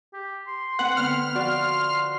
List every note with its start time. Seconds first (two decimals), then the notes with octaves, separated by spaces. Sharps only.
0.13 G4
0.47 C6
0.79 C4 B4 F#5
0.97 D3 B3 F6
1.35 F3 F#4 D5 C6